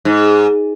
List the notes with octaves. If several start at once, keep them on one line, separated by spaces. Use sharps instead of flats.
G#2